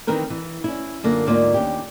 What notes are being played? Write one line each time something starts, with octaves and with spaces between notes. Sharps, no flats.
D#3 E3 C4 A#4 B4
E3
C#4 E4
F#2 D3 A#3 F4
D2 G#2 A#3 F4 D5
D#2 C#4 G4